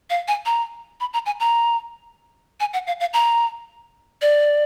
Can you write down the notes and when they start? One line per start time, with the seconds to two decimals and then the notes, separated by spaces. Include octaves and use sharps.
0.10 F5
0.28 G#5
0.46 A#5
1.00 B5
1.13 A#5
1.26 G#5
1.40 A#5
2.60 G#5
2.73 F#5
2.87 F5
3.00 F5
3.13 A#5
4.22 D5